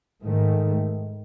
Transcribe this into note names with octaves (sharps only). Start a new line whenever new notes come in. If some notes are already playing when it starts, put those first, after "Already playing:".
G#2 D#3 A3